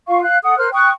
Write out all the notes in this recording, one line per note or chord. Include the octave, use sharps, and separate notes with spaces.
F4 F5 C#6
F5 F#6
A4 F#5 D#6
A#4 C5 F6 F#6
G5 C#6 D#6 F#6